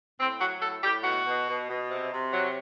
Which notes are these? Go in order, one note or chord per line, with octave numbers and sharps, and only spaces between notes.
A2 C4
F#3 F#4
A2 A4
A2 G4
B2 F#4
B2
B2
B2
C3
C3
F#3